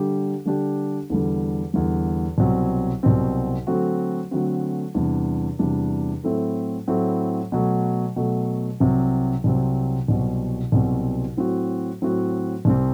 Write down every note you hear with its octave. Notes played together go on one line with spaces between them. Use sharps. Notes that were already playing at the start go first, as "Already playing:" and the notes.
Already playing: D3 G3 D4 G4
D3 G3 D4 G4
E2 D3 G3
E2 D3 G3
C2 B2 F#3 C4
C2 B2 F#3 C4
D3 F#3 A3 C4 F#4
D3 F#3 A3 C4 F#4
E2 C3 G3 D4
E2 C3 G3 D4
A2 F#3 A3 C4 E4
A2 F#3 A3 C4 E4
B2 F#3 A3
B2 F#3 A3
C2 C3 F#3 C4
C2 C3 F#3 C4
C2 B2 F#3 C4
C2 B2 F#3 C4
A2 F#3 C4 F#4
A2 F#3 C4 F#4
C2 C3 G3 C4